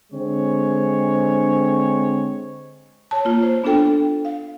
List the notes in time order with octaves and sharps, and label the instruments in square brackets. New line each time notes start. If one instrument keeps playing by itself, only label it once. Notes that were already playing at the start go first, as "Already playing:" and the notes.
[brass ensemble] D3 G#3 C4 C#5
[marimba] C#5 A5
A#3 F4
C5
B3 D4 F4 A4 G5
F5